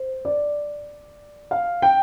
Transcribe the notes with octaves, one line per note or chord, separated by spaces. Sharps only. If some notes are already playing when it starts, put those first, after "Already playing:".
Already playing: C5
D5
F5
G5